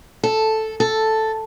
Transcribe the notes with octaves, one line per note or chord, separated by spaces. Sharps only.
A4
A4